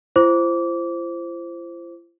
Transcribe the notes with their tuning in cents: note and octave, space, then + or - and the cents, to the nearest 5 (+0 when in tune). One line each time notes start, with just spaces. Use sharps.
F4 -45 C5 +0 D6 -25